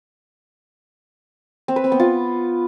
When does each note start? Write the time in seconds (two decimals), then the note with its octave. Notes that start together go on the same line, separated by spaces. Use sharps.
1.68 C4
1.76 B4
1.84 C4
1.92 B3
2.00 F4